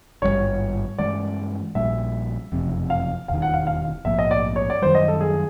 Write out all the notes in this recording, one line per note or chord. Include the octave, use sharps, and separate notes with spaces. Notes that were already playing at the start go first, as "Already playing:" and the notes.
G#1 G2 D#3 G3 C#5
G2 E3 G#3 D5
A#1 A#2 G3 E5
F#1 F2 C3
F5
E1 D#2 D#3 F5
F#5
F5
F5
A#1 G#2 F3 A#3 E5
D#5
D5
C#5
D5
F#2 D#3 G3 C5
D#5
A4
G#4